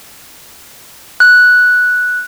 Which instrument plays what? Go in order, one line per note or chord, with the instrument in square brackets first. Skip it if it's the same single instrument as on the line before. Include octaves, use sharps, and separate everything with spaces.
[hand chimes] F#6